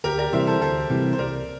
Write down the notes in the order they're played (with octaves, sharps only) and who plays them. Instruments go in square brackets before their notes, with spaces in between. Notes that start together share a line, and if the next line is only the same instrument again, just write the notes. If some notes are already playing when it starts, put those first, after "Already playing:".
[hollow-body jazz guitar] D2 [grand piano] G4 A#4
[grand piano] A#4 D5
[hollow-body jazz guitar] C3 E3 G3 [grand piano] C5 E5
[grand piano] A4 C5
[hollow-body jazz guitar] D2 [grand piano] A4 C5
[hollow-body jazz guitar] C3 E3 G3
[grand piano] C5
[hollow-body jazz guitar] C2 [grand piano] A#4 D5